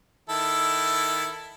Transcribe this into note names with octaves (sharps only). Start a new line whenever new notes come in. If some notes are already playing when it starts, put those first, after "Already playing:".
D#3 E4 A4